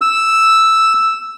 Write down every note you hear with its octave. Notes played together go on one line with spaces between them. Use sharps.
E6